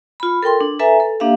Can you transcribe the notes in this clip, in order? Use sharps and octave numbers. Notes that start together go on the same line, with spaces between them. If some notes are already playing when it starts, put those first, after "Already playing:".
F4 B5
A4 A#4 G5 C6
D4
A4 B4 E5 G#5 A#5
A4
A#3 D4 G4 E5 F5